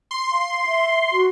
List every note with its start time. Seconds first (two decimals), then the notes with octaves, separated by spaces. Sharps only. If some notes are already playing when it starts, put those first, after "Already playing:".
0.11 C6
0.32 F5
0.66 E5
1.12 F#4